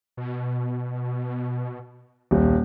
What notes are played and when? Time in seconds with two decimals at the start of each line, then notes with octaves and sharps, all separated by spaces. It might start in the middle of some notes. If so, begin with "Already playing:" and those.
0.17 B2
2.31 D#1 B1